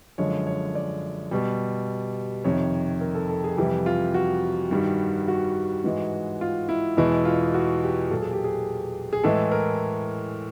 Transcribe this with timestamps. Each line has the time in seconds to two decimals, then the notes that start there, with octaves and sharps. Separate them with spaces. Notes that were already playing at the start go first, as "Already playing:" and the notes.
0.18 F#2 D3 F3 G#3 C#5
0.47 C#5
0.75 D5
1.31 B2 G3
2.44 F2 C3 D#3 C#5
3.01 A#4
3.15 A4
3.29 A4
3.44 G#4
3.57 F2 C3 E3 G3 G4
3.86 F4
4.14 F#4
4.71 G2 D#3 G3
5.28 F#4
5.84 G#2 E3 G#3
6.41 F4
6.69 E4
6.97 E2 B2 G#3 E4
7.25 F4
7.54 F#4
7.83 G4
8.10 A#2 F#3 A4
8.22 G#4
8.32 G4
8.44 G#4
9.13 G#4
9.23 A2 E3 G#3 A4
9.52 A#4